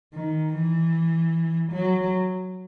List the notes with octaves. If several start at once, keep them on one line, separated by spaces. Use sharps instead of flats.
D#3
E3
F#3